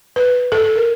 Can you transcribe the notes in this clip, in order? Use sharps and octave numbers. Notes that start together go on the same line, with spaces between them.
B4
A4
A#4